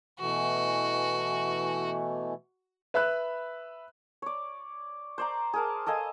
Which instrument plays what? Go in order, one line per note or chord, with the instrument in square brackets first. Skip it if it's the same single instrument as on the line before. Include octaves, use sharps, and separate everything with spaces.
[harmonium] B2 E3 A3 [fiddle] F#4
[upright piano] B4 E5 B5 F#6
[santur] C#5 D5
C5 D5 A#5
G#4 A#4 A5
A4 D#5 F5 G#5